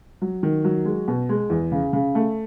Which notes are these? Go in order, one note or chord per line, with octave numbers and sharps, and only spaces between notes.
F#3
D#3
F#3
G#3
B2
G#3
E2
C#3
C#3
A3